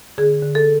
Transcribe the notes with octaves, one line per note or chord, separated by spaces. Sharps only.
D3 G#4
D3
A4